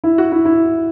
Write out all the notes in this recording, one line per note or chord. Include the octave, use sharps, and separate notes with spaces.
E4
F#4
E4
E4